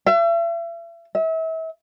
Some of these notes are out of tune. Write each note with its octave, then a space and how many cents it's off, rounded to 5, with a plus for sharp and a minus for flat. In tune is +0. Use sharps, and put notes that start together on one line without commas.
E5 +40
E5 -35